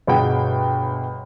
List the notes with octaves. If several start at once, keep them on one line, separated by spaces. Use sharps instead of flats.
G1 B2 G#4 F#5 G5